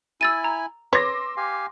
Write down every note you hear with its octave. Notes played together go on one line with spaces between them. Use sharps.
E4 G#5 E6 A6 D#7
A#5
B4 C#5 C6 D6 E6 A#6
G4 F5 G#5